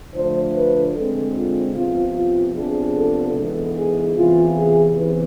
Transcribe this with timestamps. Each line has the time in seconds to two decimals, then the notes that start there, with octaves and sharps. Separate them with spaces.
0.14 D3 F3 A3 D4 C5
0.55 B4
0.94 D3 G#3 C4 A4
1.34 F4
1.74 C3 F3 B3 F4
2.15 F4
2.54 C3 F3 B3 D4 G#4
2.96 A4
3.34 G#2 E3 B3 A4
3.75 G#4
4.16 E2 C3 E3 F4
4.55 G#4
4.95 E2 C3 E3 B4